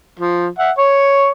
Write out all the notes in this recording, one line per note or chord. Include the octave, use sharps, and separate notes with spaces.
F3
E5 F#5
C#5